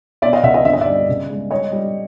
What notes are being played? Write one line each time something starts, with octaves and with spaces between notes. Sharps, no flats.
B2 D5 E5
D#5 F5
C#2 E5 F#5
D#5 F5
G1 E5
D#5
D5 E5
G3
C#3
G#3
G3 C#5 D#5
G3